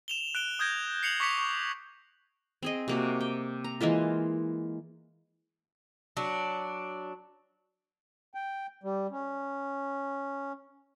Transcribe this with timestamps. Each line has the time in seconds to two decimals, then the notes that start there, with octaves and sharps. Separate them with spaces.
0.08 E7 F7 G7
0.35 F#6 D7 G7
0.59 D#6 G6 G#6 A#6 D7
1.03 C7 C#7 F7 F#7
1.20 C#6 D6 B6 C#7 F7
1.38 C#6
2.62 C4 G#4 D#5
2.88 C3 A#3 F#4
3.20 G5
3.64 A#5
3.81 E3 G#3 A#3 F4
6.17 F#3 D4
8.34 G5
8.83 G3
9.11 C#4